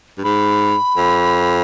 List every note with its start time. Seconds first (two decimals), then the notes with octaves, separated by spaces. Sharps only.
0.18 G2
0.24 G#2 B5
0.97 F2